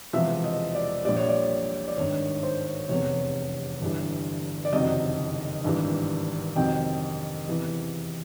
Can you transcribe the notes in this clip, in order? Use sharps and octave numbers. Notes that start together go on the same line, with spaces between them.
E1 E2 C3 F3 E5
D#5
D5
A#1 A#2 G3 D5
C#5
D5
D5
G#1 G2 D#3 C#5
C#5
C5
C#5
F1 E2 C3 C#5
G1 G2 E3 G3
D5
F#1 F2 C3 D#3 F#3 D#5
G#1 G2 E3 G3
F2 C3 D#3 F#3 G5
E2 C3 E3